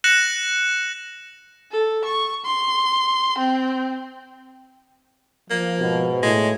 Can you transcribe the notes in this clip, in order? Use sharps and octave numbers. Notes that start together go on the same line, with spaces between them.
F#6 A#6 C#7 E7 F#7
A4
C#6
C6
C4
F3 A#3
G#2 B2
A2 G#3